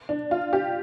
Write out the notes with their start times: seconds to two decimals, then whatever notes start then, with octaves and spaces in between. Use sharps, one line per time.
0.09 D4
0.31 F4
0.53 G4